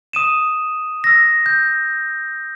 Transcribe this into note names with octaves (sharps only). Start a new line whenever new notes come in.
D#6 D#7 E7
E6 A#6
G6